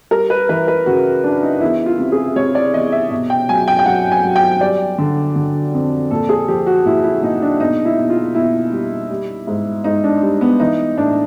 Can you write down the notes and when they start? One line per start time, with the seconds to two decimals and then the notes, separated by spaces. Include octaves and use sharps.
0.11 G3 A#4
0.30 B4
0.49 E3 B4
0.68 B4
0.86 C#3 F#4
1.24 F#2 D4
1.43 D#4
1.61 E2 E4
1.86 F4
1.99 C3
2.12 G#4
2.36 C3 C#5
2.55 D5
2.74 E2 D#5
2.92 E5
3.11 B2
3.30 G5
3.49 F#3 G#5
3.68 G5
3.79 G5
3.86 F#3 F#5
4.12 G#5
4.24 F#3
4.36 G5
4.61 G3 D5
4.98 D3
5.36 D3
5.74 F2
6.11 A#2 A4
6.29 G#4
6.48 F3 G4
6.66 F#4
6.85 A#2 E4
7.04 E4
7.22 A#2 D#4
7.42 D4
7.60 B2 D#4
7.85 E4
7.98 B2
8.10 F4
8.35 B2 E4
8.72 G3
9.11 G3
9.47 G#2
9.84 G#2 D#4
10.04 D4
10.22 G3
10.41 B3
10.60 E3 D#4
10.97 A2 D4